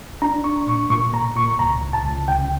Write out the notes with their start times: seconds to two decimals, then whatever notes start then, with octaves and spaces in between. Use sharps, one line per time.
0.22 D4 A#5
0.44 D4 C#6
0.67 A#2 C#6
0.90 A#2 C#6
1.14 A#2 A#5
1.36 A#2 C#6
1.59 C#2 A#5
1.82 C#2
1.93 A5
2.05 C#2
2.28 C#3 G5